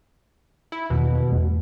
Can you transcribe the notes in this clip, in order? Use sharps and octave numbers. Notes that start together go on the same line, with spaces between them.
E4
E2 B2 D#3
G#1 E2 A3